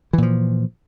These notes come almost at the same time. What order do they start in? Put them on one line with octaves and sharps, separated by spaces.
E3 A#2 F3